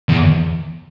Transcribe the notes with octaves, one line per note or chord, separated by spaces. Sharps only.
E2